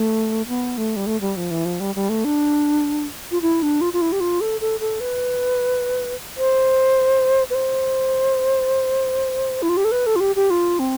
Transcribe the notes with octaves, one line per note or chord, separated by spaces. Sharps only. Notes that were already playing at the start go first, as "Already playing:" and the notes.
Already playing: A3
B3
A3
G3
A3
G3
F3
E3
F3
G3
G3
A3
D4
F4
E4
D4
F4
F4
E4
G4
F4
A4
A4
A4
B4
C5
B4
C5
E4
F4
G4
A4
B4
A4
F4
G4
G4
F4
C4